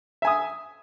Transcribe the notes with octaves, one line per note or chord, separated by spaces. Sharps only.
E5 G#5 D#6